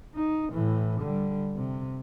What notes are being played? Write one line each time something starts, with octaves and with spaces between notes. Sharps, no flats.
D#4
A2 E3
D3 G3
C3